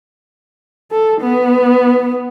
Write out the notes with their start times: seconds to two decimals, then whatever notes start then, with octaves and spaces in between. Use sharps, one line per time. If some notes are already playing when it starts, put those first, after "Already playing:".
0.91 A4
1.21 B3